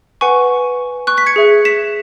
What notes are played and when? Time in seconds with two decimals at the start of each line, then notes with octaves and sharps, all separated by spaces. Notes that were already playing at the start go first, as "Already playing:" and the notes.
0.21 B4 F#5 G#5 C#6
1.07 C#6 F#6
1.17 F#6 B6
1.26 G#6 C#7
1.36 G#4 E5
1.65 B6 E7